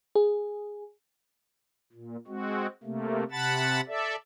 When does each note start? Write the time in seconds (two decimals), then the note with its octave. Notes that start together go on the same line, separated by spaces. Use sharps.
0.15 G#4
1.92 A#2
2.27 G#3 C4 F#4
2.83 C3 A3 A#3
3.31 C3 F#5 A5 B5 A6
3.87 A4 D5 E5